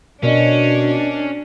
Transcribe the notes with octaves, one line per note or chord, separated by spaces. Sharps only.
B2 C#4 D4 A#4 D5 D#5